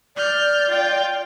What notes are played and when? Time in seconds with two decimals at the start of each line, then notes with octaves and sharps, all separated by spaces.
0.16 D5 F6 G6
0.69 F4 G5